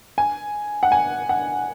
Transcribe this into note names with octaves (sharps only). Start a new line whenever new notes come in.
G#5
F#5
G#5
F#5